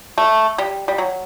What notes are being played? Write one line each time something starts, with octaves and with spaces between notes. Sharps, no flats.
A3
G3
G3
F#3